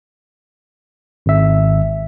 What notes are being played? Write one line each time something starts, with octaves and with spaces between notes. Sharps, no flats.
G#1 E5